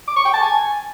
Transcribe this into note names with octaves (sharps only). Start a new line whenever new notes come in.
D6
C#6
G5
A5
G#5